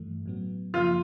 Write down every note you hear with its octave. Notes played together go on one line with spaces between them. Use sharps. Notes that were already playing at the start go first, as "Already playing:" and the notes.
Already playing: G2 E3 A3
A2 F#3 B3
F#2 C#3 F3 A#3 F4